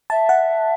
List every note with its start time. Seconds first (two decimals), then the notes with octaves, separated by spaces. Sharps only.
0.10 E5 A5
0.29 F#5